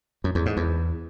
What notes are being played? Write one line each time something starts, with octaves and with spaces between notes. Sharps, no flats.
F#2
E2
G#2
E2